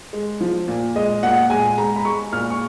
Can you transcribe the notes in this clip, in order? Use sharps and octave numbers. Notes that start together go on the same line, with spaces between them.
G#3
F3
A#2
G#3 D#5
A#2 F#5
G#3 G#5
G#3 A#5
B5
G#3 C#6
A#2 F6
C#6